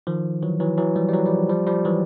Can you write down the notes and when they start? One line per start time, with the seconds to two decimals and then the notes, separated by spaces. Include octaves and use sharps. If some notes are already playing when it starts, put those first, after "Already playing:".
0.07 D#3 F3
0.43 E3 F#3
0.60 E3 F#3
0.78 E3 F#3
0.96 F3 G3
1.08 G3
1.13 E3 F#3
1.26 F3 G3
1.49 F3 G3
1.67 F3 G3
1.85 E3 F#3